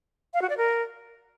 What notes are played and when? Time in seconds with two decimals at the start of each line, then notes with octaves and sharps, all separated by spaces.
0.34 F5
0.42 F#4
0.50 D5
0.57 A#4